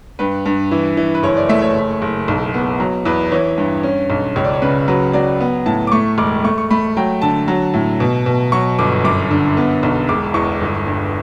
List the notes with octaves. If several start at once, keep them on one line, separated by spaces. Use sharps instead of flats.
G2 B4
G2
E3
E3
B4
F#1 C#5
D5
A3 E5
C#5
F#1
F#1
B1
B3
F#3
E2 B4
E3 C#5
G2
C#4
B1
C#2 C#5
D5
C#5
C#3 B4
F#3 B4
F#3 D5
B3
A2 A5
D6
A3 C#6
E1 D6
A3 C#6
C#6
A3 B5
F#3 G5
D3 A5
F#3
A2
B2
B2
F#3 C#6
G1 D6
F#2 D6
D3
B3
B1
E1 D6
E2 C#6
G1
G2